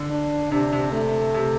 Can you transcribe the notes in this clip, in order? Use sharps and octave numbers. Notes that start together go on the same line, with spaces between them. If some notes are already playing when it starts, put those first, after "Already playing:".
Already playing: D3
D4
C3 D4
C3
A3
C3